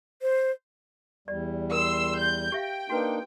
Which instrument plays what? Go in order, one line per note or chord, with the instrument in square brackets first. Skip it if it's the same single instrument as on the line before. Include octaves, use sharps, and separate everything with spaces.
[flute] C5
[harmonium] E2 G3 [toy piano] D5
[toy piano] A#4 [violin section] C6 E6
[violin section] G6
[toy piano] G4 E5 F5 [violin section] G5
[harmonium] A#3 D4 D#4 [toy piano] F#4 B4